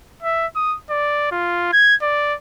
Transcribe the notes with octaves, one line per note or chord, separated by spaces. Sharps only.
E5
D#6
D5
F4
G#6
D5